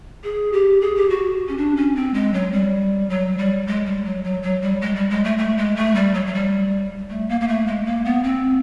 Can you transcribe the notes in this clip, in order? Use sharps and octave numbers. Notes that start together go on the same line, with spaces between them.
G#4
G4
G#4
G4
F#4
C#4
D4
C#4
C4
G#3
F#3
G3
F#3
G3
G#3
G3
F#3
F#3
F#3
G3
G#3
G3
G#3
A3
A3
G#3
A3
G3
F#3
F#3
G3
A3
A#3
A#3
A3
G#3
A#3
B3
C4